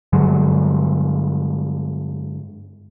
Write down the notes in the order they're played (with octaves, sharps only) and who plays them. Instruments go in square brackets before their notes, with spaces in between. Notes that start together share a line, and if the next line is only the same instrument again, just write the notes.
[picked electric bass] G2 D3 F#3 G#3